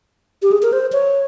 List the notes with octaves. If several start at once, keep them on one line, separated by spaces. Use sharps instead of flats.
G4
G#4
A#4
C5
C#5